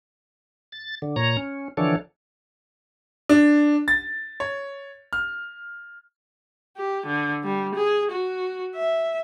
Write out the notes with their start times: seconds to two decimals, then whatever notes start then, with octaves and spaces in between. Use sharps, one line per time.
0.72 A6
1.02 D3
1.16 A#2 C#5 A#5
1.37 C#4
1.77 D3 E3 F3 D4 A4 C#5
3.29 D4
3.88 A6
4.40 C#5
5.13 F6
6.77 G4
7.06 D3
7.44 G3
7.75 G#4
8.11 F#4
8.75 E5